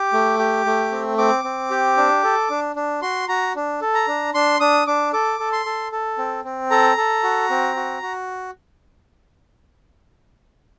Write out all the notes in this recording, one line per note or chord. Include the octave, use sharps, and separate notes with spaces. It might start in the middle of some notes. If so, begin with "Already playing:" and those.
Already playing: G4 D6
A3
G4
A3
C4
C4 D6
C4
G4
D4
A4
D4
D4
F#4 C6
F#4 A#5
D4
A4
A#5
D4
D4 C6
D4 D#6
D4 D6
A4 D6
A4
C6
A4
A4
C4
C4
A4 A#5
A4
F#4
C4
F#4
F#4